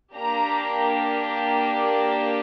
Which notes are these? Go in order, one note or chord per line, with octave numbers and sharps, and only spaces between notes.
A#3 D4 G4 A#5
A5